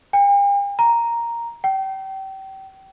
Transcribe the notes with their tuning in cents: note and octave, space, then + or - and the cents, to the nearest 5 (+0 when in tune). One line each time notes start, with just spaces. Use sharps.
G5 +45
A#5 +0
G5 -30